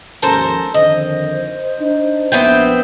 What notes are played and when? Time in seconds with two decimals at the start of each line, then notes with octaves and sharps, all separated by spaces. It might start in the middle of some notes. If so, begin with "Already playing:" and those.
0.22 D#2 G#2 F3 C#4 A4 A#4 C5
0.74 F2 D3 D#3 C5 D#5
1.80 D4 D#4
2.32 A#1 B3 C4 E5 G5